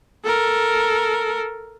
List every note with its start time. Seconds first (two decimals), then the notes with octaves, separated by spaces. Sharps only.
0.24 A4 A#4